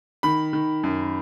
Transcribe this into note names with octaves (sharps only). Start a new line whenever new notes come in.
D#3 B5
D#3
F#2